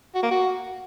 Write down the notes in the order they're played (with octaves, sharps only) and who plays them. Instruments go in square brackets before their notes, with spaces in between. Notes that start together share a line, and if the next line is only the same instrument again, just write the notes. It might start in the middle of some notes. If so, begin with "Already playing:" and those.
[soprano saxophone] F#4
A#3
F#4